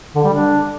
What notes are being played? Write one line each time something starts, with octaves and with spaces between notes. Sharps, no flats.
D3
G3
D4